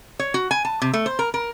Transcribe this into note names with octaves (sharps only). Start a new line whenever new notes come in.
C#5
F#4
G#5
A5
C3
A3
C5
A#4
A#4